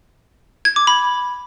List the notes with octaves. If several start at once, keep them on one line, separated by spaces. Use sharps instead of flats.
G#6
D6
B5